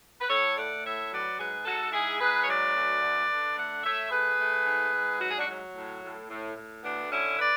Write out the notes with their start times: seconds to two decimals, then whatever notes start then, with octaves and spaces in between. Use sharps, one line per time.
0.21 B4
0.29 A2 A4 C#5
0.56 A3 D5 F#5
0.83 A2 C#5 E5
1.11 F#3 B4 D5
1.38 G#2 G#4 B4
1.65 G#2 F#4 A4
1.93 G#2 E4 G#4
2.20 G#2 G#4 B4
2.41 C#5
2.47 F#3 B4 D5
2.74 D2
3.02 D3
3.29 D3
3.56 A3 D5 F#5
3.83 A3 C#5 E5
4.11 A3 G#4 B4
4.38 A3
4.65 G#2
4.92 G#2
5.20 F#3 F#4
5.29 G#4
5.38 D4 F#4
5.47 F#3
5.74 A2
6.02 A2
6.29 A2
6.56 A2
6.83 D2 B3 D4
7.11 D3 C#4 E4
7.38 B4 D5